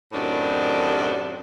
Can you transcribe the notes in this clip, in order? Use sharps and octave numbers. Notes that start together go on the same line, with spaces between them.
F#2 A2 C3 D#3 D4